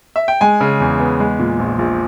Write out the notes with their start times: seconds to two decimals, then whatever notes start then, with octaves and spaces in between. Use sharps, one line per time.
0.16 E5
0.28 G5
0.41 G#3 G#5
0.61 C#3
0.80 E2
1.00 B3
1.20 G#3
1.39 A#2
1.59 A#1
1.79 A#1